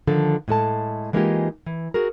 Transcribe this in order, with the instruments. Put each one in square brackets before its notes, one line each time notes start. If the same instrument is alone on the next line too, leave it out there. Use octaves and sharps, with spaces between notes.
[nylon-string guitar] D3 D#3 F3 A4
A2 G#3 A4 A5
E3 G#3 A#3 D#4 F4 G4
E3
F#4 G#4 A#4